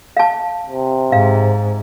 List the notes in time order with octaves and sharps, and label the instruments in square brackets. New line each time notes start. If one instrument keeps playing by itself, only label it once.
[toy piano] F5 A5
[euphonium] C3
[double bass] G#2 [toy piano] F5